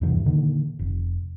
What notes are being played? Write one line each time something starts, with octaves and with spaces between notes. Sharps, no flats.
E2 G2 C3 E3
A#2 D3 D#3 A#3
F1